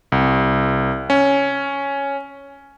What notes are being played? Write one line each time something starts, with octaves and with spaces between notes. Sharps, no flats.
C2
C#4